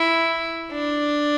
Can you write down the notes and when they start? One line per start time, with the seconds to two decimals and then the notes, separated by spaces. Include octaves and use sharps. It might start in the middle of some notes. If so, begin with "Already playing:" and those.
Already playing: E4
0.72 D4